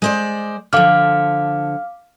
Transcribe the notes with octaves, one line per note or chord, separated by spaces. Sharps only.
G#3 C5 D5
D3 F3 F5 D6 F6